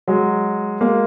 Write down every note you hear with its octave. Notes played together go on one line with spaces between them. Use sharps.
F#3 G#3
G#3 A#3